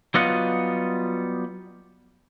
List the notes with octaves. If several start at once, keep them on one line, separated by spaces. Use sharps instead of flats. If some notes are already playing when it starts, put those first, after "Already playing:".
F#3 G3 B3 F4 D#5 F#5